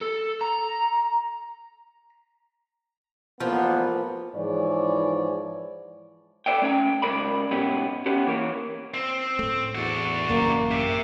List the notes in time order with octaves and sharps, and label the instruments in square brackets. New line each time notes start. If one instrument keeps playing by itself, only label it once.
[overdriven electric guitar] A4
A#5
[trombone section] A1 A#3 B3 [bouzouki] F3
[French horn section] G#2 E3 F3 G#4 C#5 D5
[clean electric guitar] A4 B4 C#5 D5 E5 G5
A3 C#4 G5 A#5
C#2 E3 C#4 A#4 D5 B5
G#2 B2 B3 C#4 E4 G4
B3 C#4 G4
E3 A#3 C#5
[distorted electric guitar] C4
[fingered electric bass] A2 A3
[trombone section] E2 [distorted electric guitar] D4 F#4
[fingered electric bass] A1 F#2 C#3 [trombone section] A#3
[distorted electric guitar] G4 E5